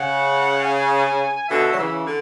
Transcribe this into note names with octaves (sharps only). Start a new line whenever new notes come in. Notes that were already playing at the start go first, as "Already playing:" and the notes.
Already playing: C#3 F#5
G#5
B2 D3 E5
F#3
C#3 E3
D3